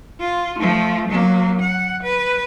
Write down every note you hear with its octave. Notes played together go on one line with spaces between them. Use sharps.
F4
F3 A3
F#3 A#3
F#5
B4